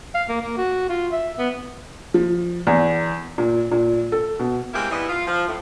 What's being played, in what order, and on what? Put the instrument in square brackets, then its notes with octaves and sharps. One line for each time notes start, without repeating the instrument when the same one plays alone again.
[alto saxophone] F5
A#3
A#3
F#4
F4
E5
B3
[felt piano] F3
E2
A#2
A#2
A4
B2
[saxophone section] G#3 A#3 C4 E4 G4
E3 G3 B3 E4 D#5
F4
F3
A2